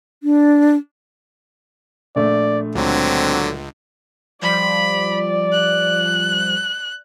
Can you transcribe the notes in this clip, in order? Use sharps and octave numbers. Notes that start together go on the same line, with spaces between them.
D4
A#1 A3 D5
C#2 D3 F#3 C4
F3 G3 D5 B5
F#6